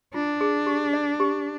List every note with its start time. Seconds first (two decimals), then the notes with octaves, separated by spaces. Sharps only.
0.14 D4 F4
0.41 G#4
0.67 G4
0.93 D5
1.20 G4